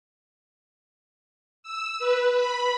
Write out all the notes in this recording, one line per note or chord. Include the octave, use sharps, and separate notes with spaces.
E6
B4
B5